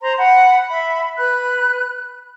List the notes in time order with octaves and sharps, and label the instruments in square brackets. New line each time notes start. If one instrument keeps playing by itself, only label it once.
[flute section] C5 A#5 C6
F#5 B5
E5 B5
B4 B5 F#6